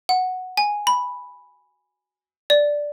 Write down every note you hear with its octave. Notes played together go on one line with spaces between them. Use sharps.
F#5
G#5
B5
D5